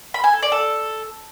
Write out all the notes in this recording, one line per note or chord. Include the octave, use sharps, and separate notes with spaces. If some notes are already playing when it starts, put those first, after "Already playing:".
B5
G#5
A4
D5
A4